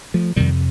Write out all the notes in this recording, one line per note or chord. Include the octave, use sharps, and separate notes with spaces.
F3 A3
F2 C3 D#3 G3